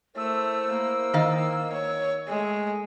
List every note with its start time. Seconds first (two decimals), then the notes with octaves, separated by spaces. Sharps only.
0.17 A3 E4 A#4 C5 E6
0.74 A#3
1.14 D#3 D#5 F5
1.72 C#5
2.28 G#3 A3